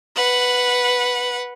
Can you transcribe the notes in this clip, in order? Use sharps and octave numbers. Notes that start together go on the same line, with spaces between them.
B4 F#5